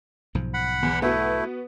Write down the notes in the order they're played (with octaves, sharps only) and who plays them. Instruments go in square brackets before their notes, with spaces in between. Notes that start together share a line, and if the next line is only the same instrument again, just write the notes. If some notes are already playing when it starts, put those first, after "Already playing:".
[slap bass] B1 G#2 F3
[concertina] F#5 B5
[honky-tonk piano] E2
[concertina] A3 E4 [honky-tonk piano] B3 F#4